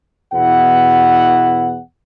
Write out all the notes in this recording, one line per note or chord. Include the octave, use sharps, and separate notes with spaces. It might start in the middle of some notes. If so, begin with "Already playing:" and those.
E2 B2 E4 F#5